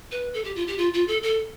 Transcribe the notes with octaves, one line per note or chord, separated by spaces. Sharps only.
B4
A4
G4
F4
G4
F4
F4
A4
A4